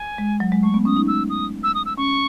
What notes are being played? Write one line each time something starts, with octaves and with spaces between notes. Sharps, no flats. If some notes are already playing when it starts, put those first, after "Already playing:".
Already playing: G#5
G#3
F#3
G#3
A3 C#6
B3
C#4 D#6
D#4
E6
D#6
E6
D#6
E6
C#4 C#6